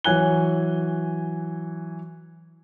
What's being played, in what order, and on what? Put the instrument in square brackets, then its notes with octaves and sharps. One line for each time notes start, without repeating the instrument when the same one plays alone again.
[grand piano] E3 F#3 C#5 G#5 F#6 G7